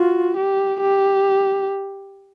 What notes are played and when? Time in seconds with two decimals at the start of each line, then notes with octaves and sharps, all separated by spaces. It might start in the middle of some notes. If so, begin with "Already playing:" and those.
Already playing: F4 F#4
0.37 G4
0.81 G4